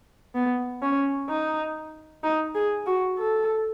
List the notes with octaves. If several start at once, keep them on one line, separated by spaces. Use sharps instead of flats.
B3
C#4
D#4
D#4
G#4
F#4
A4